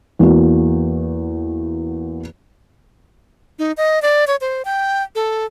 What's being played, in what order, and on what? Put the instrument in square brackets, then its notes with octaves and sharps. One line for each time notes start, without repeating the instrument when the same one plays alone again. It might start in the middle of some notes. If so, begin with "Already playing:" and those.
[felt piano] E2 A#3 F#4
[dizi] D#4
D#5
D5
C#5
C5
G5
A4